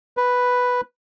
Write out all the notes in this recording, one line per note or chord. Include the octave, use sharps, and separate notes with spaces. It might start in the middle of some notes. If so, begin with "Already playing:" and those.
B4